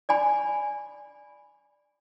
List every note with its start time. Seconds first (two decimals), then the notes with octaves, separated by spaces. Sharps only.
0.09 D5 G#5 B5